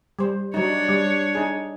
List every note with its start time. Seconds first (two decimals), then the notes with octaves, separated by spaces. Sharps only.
0.19 G3 C5
0.54 F#3 D4 D#4 C#5
0.89 G3
1.35 D#4 G#4